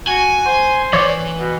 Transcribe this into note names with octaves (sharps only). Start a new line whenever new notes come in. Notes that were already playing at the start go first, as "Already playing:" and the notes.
F#4 G#5
C5
E3 C#5 D5
B2